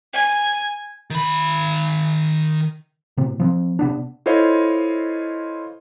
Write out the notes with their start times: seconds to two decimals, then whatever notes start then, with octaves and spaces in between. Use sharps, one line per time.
0.14 G#5
1.10 D#3 B5
3.17 A2 C3
3.40 F3 C4
3.79 C3 B3 D4
4.26 E4 F4 A4 C5 C#5 D#5